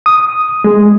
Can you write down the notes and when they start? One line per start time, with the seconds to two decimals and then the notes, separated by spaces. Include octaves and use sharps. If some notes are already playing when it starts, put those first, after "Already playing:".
0.06 D#6
0.64 G#3